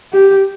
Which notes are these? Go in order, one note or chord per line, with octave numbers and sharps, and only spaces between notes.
G4